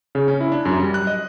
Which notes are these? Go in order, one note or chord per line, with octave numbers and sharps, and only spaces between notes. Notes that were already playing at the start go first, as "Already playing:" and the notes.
C#3
C#4
E4
D4
F#2
G3
F#6
D#5